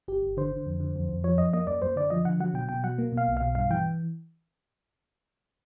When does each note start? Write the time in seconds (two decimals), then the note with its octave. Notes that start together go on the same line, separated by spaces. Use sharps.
0.08 G1 G4
0.23 G1
0.37 D3 C5
0.52 D3
0.66 F2
0.80 D3
0.96 F2
1.09 F2
1.24 F3 C#5
1.38 F#2 D#5
1.53 A#3 D#5
1.67 F#2 D5
1.82 F#2 C5
1.96 D3 D5
2.10 F3 D#5
2.25 D3 F#5
2.40 F#3 F#5
2.54 B2 G5
2.69 B2 G5
2.84 F#3 F#5
2.98 A#3
3.12 B2
3.17 F5
3.27 B1
3.37 B2 F5
3.55 G2 F5
3.70 E3 G5